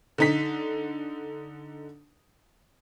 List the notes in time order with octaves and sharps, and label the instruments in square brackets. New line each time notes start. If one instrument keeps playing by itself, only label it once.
[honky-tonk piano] D3 D#4 B6